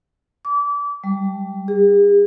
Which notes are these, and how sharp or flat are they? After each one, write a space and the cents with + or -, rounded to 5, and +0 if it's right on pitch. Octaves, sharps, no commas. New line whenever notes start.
D6 -30
G3 +0
G#4 -40